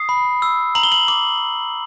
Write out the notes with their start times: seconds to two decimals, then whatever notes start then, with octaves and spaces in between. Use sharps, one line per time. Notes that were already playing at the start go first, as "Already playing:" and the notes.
Already playing: D#6 C7
0.09 B5
0.42 E6
0.75 A#5 F#7
0.83 G7
0.92 F#7
1.08 D6 F#7